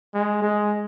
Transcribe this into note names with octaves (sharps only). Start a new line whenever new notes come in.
G#3
G#3